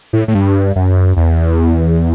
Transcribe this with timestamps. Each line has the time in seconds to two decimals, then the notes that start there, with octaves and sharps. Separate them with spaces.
0.13 A2
0.28 A2
0.35 G2
0.76 F#2
1.17 E2